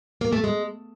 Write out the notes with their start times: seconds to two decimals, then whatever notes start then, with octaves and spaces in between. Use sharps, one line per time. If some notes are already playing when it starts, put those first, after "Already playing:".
0.21 A#3
0.32 A3
0.44 G#3